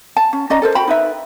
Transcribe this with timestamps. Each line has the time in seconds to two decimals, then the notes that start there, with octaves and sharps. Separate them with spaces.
0.17 A5
0.33 C#4
0.50 C#4 D5 D#5 A#5
0.62 A4 A#4 C5
0.75 F#4 G5 B5
0.88 D#4 B4 E5